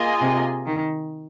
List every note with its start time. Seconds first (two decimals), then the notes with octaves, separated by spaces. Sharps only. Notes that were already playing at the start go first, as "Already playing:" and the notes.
Already playing: A#3 F4 G#4 D#5 G#5
0.21 C3
0.66 D#3